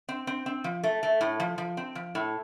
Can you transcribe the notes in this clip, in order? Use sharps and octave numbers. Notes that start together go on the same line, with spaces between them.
C4
C4
C4
F3
A3
A3
A2
F3
F3
C4
F3
A2